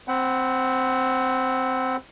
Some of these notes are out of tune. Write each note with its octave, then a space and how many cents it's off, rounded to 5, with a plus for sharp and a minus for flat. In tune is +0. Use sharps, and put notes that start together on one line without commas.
C4 +0 F#5 +20 B5 +0